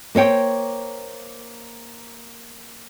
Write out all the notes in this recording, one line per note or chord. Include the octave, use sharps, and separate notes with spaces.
A#3 C5 C#5 G5